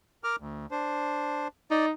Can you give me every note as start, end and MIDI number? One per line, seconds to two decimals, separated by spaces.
0.24 0.36 70
0.24 0.36 86
0.24 0.36 89
0.40 0.66 38
0.71 1.48 62
0.71 1.48 72
1.71 1.92 63
1.71 1.86 74